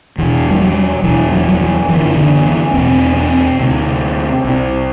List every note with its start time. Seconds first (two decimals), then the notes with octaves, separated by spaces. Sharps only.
0.18 E2 B2 E3
0.51 G3
0.61 F#3
1.04 E2 B2 E3
1.32 F#3
1.49 F#3
1.60 E3
1.88 F#2 D3 E3
2.17 D3
2.45 E3
2.74 E2 B2 C4
3.16 C4
3.59 D2 C3
4.44 C2 C3